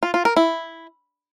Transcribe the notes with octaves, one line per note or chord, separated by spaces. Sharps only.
F4
F4
A#4
E4